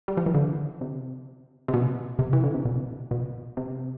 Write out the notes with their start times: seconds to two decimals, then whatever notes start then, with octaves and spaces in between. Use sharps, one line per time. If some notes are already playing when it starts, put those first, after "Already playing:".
0.08 G3
0.17 F3
0.26 E3
0.34 D3
0.81 C3
1.68 C3
1.74 B2
2.19 C3
2.33 E3
2.44 D3
2.54 C3
2.65 B2
3.11 B2
3.57 C3